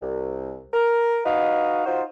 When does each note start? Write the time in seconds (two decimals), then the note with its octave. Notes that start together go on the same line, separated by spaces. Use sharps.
0.01 C2
0.73 A#4
1.25 D#4 F#4 B4 D#5 F5
1.85 D#4 F4 F#4 C5